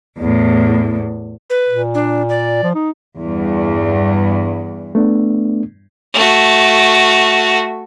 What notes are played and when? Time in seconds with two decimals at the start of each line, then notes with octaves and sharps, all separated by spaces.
0.17 E2 A2
1.50 B4
1.69 A#2
1.95 D4
2.29 D5
2.63 F3
2.75 D#4
3.20 E2 G2
4.95 A3 B3 D4
6.14 A3 F#4